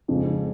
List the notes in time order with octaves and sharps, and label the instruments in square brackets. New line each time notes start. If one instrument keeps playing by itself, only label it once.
[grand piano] F2 C#3 G#3